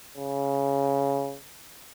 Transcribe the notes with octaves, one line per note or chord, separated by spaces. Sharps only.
C#3